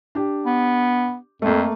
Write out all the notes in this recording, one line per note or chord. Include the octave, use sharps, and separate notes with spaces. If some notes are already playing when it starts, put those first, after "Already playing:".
D4 G4
B3
F2 A3 A#3